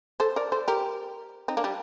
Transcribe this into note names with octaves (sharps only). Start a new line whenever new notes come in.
A4 C5
A#4 D5
A4 C5
G4 A#4
C4 D#4
A#3 D4
G3